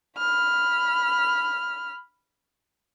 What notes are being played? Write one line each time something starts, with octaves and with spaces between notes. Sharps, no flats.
B5 F6